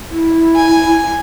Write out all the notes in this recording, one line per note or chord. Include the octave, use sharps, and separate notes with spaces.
E4
G#5